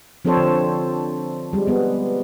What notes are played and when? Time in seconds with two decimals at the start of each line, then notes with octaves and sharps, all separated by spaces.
0.25 F3 C4 D4 A4 C5 C#5
0.37 D3
1.53 G3 G#3
1.67 G3 B3